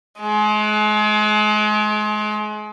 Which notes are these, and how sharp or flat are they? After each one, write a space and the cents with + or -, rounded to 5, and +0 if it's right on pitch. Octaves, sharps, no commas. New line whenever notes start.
G#3 +35